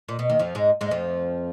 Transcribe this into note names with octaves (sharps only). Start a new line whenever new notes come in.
A#2
B2
D#2 D#3
F2 F3
G#2 G#3
G#2 G#3
F2 F3